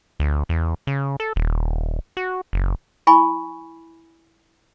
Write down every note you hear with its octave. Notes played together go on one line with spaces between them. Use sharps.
D2
E2
C#3
A4
D#1
F#4
F#1
E4 G#5 B5 C#6